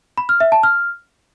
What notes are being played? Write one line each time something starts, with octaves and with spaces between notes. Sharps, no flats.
B5
F6
E5
A5
F6